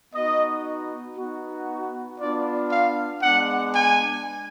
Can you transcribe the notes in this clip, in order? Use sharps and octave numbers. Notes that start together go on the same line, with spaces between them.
B3 D#4 F#4 D#5
B3 D#4 F#4
B3 D4 F4 D5
F5
G#3 B3 D4 F#5
G#5